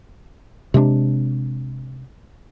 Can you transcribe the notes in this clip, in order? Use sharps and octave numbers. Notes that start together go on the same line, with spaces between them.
C3 G#3 A3 D4